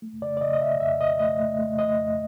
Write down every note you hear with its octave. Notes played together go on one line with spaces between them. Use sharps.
A3
C#3 D5
D5
C#3 D#5
D#5
C#3 E5
F2 E5
C#3 D#5
A3 D#5
A3
A3
A3 D#5
F2